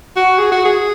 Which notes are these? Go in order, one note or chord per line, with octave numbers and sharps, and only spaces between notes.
F#4
G#4
F#4
G#4